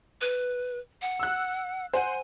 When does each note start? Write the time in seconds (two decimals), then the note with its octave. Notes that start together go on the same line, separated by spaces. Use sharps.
0.21 B4
1.02 F#5
1.20 E6 F#6
1.93 C5 F#5 G#5